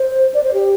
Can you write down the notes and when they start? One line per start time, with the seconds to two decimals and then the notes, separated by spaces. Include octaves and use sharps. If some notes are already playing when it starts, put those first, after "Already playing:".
Already playing: C5
0.34 D5
0.43 C5
0.54 G4